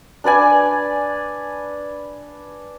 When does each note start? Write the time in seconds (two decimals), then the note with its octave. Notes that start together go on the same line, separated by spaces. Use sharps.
0.24 D4 B4 D5 G#5